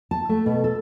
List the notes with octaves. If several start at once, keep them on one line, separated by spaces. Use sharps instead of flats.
A5
A3
B2
A4